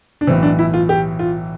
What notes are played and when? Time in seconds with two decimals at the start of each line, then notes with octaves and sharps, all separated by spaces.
0.21 D4
0.27 B1 A2 E3 C4
0.43 D4
0.59 E4
0.74 F4
0.89 G4
1.19 F4